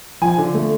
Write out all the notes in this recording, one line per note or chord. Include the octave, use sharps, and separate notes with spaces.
F3 G#5
D3
A3